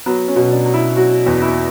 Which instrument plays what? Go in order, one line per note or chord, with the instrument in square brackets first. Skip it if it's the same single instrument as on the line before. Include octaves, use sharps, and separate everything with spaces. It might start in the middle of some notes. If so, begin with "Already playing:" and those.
[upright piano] F#3 B3
C#4
B2
D4
F#3
E4
F#3 F#4
E2
E4